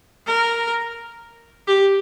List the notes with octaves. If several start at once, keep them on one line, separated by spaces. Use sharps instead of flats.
A#4
G4